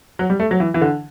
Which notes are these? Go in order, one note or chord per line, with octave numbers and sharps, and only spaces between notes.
F#3
G3
A3
F#3
E3
E3
D3